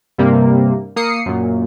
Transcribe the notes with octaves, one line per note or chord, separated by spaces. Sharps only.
G2 C3 G3 A#3
A#3 D#6 C7 C#7
F#2 A#2